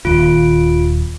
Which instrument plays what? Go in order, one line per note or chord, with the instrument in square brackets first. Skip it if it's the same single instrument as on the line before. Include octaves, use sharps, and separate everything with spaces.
[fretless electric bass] D#1 D#2 [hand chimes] F4 D7